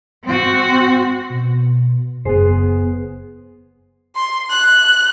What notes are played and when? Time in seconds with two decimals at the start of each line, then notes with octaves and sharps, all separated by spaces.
0.24 C4 F#4
1.30 B2
2.25 F#1 B3 G#4 C5
4.16 C6
4.50 F#6